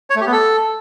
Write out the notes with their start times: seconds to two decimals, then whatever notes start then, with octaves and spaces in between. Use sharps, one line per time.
0.10 C#5
0.16 A3
0.21 G4
0.26 B3
0.32 A4